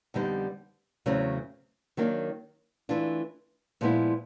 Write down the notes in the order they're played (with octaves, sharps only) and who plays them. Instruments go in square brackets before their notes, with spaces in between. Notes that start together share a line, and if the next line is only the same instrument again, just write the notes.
[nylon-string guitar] F2 D3 G3 B3 D#4
E2 C#3 F#3 A3 C4
D#3 F#3 A#3 D4
E3 A3 D4 F4
A#2 F3 G#3 B3 E4